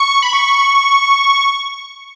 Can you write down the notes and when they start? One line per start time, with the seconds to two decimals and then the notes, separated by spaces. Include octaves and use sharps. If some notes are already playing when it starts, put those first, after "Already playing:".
Already playing: C#6
0.22 B5
0.33 C#6